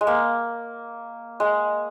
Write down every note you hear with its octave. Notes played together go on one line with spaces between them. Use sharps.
G#3
A#3
G#3